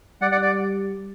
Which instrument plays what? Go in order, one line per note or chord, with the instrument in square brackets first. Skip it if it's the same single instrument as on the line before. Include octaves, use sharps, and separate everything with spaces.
[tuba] G3 [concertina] D5 F#5
[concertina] D5 F#5
D5